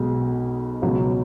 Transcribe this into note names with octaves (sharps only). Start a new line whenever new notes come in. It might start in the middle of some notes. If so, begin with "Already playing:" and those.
Already playing: B1 B2 G#3
C#2 B2 F#3